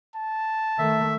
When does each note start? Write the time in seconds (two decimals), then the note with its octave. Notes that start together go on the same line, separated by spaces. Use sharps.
0.15 A5
0.79 D#3 A3 E5